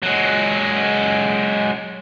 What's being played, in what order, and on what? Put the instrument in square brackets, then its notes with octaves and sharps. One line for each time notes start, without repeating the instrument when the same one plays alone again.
[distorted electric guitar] F#3 G#3